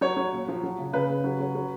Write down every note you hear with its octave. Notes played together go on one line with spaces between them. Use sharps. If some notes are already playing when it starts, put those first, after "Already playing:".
F#3 C#5
F#3
A#2
F3
F#3
C#3
C#3 B4
C#3
F#3
F#3
F#3